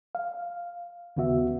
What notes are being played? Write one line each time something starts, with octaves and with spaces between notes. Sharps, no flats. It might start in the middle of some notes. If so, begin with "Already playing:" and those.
F5
D#2 C#3 B3 F#4 E5